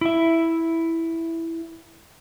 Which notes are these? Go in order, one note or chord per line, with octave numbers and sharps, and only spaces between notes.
E4 E5